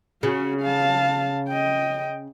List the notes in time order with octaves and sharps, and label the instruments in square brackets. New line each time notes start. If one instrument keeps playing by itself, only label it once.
[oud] C#3 [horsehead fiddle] C#4 F#4
[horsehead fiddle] F5 A5
D#5 G5